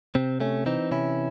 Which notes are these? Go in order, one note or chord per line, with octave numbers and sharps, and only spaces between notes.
C3 C4
A3 C#4
E3 C4 D#4
C3 C#4 E4